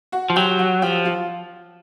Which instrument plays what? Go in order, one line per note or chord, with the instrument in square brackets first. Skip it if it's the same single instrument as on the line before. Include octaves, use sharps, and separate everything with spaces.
[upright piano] F#4 F#5
[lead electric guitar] F3
[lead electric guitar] F#3 [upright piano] G4 G5
[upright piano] F#4 F#5
[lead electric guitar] F3 [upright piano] G4 G5
[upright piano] F4 F5